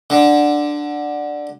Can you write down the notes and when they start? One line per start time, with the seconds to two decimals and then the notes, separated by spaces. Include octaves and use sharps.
0.10 D3